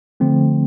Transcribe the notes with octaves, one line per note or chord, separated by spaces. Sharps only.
D3 F3 A3 C4